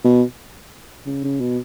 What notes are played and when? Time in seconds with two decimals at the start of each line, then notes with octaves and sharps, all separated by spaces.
0.04 B2
1.06 C#3
1.24 C#3
1.40 B2